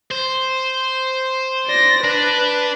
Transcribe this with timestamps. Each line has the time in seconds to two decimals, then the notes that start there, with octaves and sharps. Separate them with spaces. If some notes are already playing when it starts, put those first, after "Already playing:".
0.11 C5
1.67 D5 A#6
2.04 D4 B4